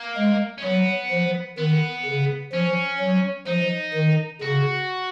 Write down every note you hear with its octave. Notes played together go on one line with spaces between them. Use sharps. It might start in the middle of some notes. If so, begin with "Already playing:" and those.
Already playing: A#3
G#3
C#4
F#3 B3
F3
D#3 B3
C#3
F3 C#4
F#3
F3 D#4
D#3
C#3 F#4